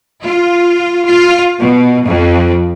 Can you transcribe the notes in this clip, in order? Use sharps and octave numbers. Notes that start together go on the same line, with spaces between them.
F4
F4
B2
F2